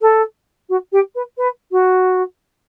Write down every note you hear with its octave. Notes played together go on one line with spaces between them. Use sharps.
A4
F#4
G4
B4
B4
F#4